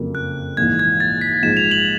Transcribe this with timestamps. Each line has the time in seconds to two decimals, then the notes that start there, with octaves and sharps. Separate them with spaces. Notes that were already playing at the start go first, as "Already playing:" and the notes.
Already playing: F#1 F2 C#3 F#3 A#3
0.15 F#6
0.57 A#1 G#2 E3 G#6
0.79 G#6
1.00 A6
1.21 B6
1.43 A#1 G#2 F3 G#3 E7
1.57 F7
1.71 F#7